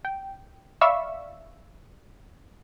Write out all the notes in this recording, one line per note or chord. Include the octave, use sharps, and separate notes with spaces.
G5
D5 E5 F5 B5 C#6 E6